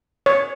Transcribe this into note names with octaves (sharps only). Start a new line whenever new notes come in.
C#5